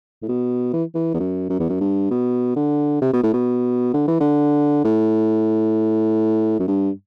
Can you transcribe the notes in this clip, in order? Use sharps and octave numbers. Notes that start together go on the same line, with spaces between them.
A2
B2
E3
E3
E2
F#2
F#2
E2
F#2
G2
B2
D3
C3
B2
A2
B2
D3
E3
D3
A2
F#2
G2